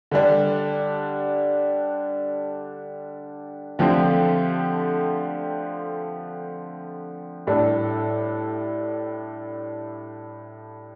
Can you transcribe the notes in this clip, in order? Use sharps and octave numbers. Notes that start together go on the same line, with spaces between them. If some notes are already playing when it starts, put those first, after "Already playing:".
D3 G3 D4
D3 F3 A3 C4 G4
A2 G3 D4 A4